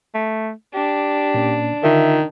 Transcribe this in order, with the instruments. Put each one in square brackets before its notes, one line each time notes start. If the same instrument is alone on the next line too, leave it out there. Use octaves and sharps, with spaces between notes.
[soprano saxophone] A3
[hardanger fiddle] D4 [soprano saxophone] G4
[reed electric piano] A#2 A#3 C#4
[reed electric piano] D3 F4 A#4 [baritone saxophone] D#3 [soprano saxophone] E5